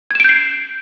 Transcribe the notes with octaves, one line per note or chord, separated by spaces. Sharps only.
G6 G#6 C7 D7 E7